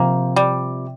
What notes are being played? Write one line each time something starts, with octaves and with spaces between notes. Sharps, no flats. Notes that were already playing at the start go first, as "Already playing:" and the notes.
Already playing: C3 F3 A#3 C4
G3